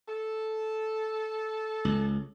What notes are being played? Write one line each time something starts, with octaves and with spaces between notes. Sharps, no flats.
A4
C#2